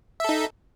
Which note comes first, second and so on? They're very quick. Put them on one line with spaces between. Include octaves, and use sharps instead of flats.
E5 A4 D#4